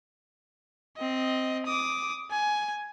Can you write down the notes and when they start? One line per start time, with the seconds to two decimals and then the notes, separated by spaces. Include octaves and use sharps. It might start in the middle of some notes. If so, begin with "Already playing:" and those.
0.97 C4 D#5
1.66 D6 D#6
2.31 G#5